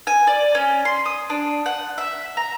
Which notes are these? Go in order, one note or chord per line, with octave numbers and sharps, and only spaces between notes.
G#5
D5
C#4
C6
D#6
D4
F#5
E5
A#5